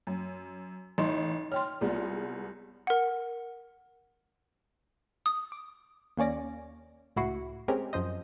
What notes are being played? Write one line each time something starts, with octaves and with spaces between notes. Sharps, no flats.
F#2
A1 D#4 D#5 C6
C#5 G5 C6 F6
C2 G#3 B3 F4 D5
A#4 F#5
D#6
D6
D#2 A#3 C#4 D5 A#6
C#2 A2 E4 F#4 C7 C#7
G#3 C4 C#4 G4 G#4 A#4
F#2 F3 C5 D#5